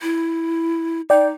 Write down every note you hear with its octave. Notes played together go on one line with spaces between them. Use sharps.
E4
D#4 D5 G5